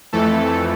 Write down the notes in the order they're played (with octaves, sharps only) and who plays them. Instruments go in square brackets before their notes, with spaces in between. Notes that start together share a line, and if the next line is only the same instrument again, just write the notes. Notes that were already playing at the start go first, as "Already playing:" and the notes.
[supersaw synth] F2 E3 A3 A4